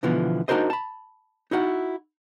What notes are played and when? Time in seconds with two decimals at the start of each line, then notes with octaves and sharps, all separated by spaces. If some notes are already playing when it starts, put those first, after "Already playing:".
0.03 B2 D3 E3 F3 B3
0.48 D4 D#4 F#4 A#4 C5 D#5
0.70 A5 B5
1.51 D#4 E4 F#4 F#5